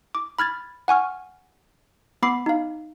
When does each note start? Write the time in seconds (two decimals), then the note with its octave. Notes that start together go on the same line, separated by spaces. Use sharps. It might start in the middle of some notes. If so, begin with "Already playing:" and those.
0.15 D6
0.39 B5 F6 G#6 A6
0.88 F#5 G#5 C#6 F6
2.22 B3 B5 D6 C7
2.46 D#4 F5